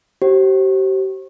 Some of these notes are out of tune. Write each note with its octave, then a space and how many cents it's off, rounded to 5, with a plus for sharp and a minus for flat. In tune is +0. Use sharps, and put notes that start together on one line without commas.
G4 -40 C5 +30